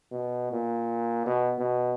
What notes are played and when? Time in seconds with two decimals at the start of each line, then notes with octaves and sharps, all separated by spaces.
0.12 B2
0.52 A#2
1.26 B2
1.59 B2